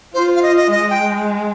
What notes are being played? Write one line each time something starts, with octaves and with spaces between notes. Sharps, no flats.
F4 C5
F5
D#5
D#5
G#3 D#5
G5